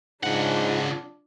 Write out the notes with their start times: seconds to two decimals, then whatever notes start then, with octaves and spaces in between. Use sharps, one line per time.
0.23 G#2 C#3 D4 F4 F#5